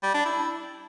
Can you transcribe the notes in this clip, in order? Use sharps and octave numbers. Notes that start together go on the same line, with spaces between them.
G3
D4
E4